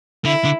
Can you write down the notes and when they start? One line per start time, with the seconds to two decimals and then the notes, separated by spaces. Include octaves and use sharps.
0.25 D3 E4
0.45 D3